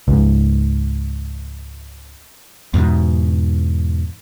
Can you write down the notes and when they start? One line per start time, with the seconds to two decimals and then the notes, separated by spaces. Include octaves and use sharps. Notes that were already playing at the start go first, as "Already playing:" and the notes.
0.08 C#2 G#2
2.74 E2 G#2 B2